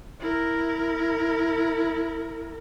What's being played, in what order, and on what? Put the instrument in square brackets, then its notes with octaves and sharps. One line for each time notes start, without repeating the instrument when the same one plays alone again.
[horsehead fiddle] E4 A#4